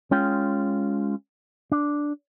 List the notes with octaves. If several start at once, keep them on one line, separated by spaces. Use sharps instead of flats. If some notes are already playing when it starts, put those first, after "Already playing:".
G#3 C#4 F4 G5
D4